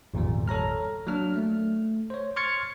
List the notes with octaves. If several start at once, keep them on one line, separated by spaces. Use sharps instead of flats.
G#1 E2 A#2 F3 G3
A4 C#5 A#5 F6
F#3 A#3 D4 F6
A3
C5 C#5
C6 C#6 F6 G#6 A6 C#7